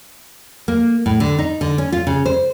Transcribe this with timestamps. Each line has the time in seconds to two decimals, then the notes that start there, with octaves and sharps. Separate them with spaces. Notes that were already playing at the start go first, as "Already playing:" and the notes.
0.68 A#3
1.06 A2
1.20 D3
1.39 D#4
1.61 D3
1.78 C#4
1.93 F4
2.07 C#3
2.26 C5